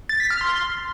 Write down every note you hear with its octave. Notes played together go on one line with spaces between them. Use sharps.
A6
B6
F6
C6